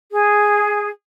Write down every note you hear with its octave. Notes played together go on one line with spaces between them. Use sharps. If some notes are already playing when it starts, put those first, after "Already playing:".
G#4